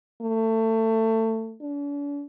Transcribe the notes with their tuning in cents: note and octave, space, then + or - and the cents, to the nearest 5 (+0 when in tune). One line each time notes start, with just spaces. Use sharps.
A3 +25
D4 -45